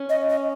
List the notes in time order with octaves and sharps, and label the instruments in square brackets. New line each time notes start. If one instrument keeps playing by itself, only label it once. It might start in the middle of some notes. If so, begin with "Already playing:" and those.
Already playing: [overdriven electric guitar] C#4
[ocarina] D#5
D#5